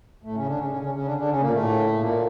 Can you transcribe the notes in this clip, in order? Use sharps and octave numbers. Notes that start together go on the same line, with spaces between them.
A2 A3
C#3 C#4
D3 D4
C#3 C#4
C#3 C#4
C#3 C#4
C#3 C#4
D3 D4
D3 D4
C#3 C#4
A#2 A#3
A2 A3
A#2 A#3